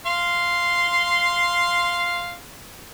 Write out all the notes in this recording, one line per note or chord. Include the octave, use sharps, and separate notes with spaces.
F5 C6